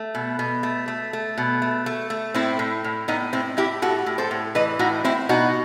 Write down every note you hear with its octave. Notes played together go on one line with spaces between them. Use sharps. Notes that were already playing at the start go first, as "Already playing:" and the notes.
Already playing: A3
B2
B2
A3
A3
A3
B2
A3
A3
A3
A2 C4 E4
A2
A2
A2 B3 D#4
A2 C4 E4
A2 E4 G4
A2 F#4 A4
A2
A4 C5
A2
E3 B4 D#5
A2 D#4 F#4
A2 C4 E4
B2 D#4 F#4